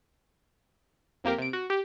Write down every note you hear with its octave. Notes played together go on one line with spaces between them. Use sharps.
F2 A#3 G4 A#4
C3 D7
F#4
G4